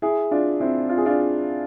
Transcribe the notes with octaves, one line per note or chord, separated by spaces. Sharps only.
E4 G#4
D4 F4
C4 E4
F4
G#4
D4 F4